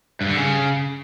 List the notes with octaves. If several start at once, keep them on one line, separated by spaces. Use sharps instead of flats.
G2
D3
C#3